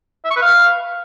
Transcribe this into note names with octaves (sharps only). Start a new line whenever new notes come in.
E5
C#6
B4
F5